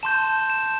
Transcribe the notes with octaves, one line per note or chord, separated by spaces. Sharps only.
A5 C6 G6 E7
E7